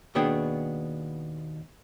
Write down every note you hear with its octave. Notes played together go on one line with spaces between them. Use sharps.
D#2 B2 B3 D4 G#4 G5